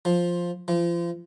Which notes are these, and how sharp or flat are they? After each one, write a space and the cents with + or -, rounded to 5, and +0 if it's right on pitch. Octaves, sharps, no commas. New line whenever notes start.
F3 +5
F3 -30